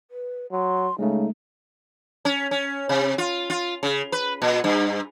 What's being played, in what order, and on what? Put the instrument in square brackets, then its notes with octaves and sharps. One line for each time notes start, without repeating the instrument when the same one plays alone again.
[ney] B4
[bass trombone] F#3 [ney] C6
[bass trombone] C#3 [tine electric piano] G#3 A3 [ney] D#4
[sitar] C#4
C#4
C3
F4
F4
C#3
B4
A#2
G2